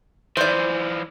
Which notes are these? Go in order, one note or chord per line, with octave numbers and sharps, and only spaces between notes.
E3 F3 C5 D5